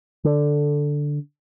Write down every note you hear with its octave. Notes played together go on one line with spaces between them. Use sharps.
D3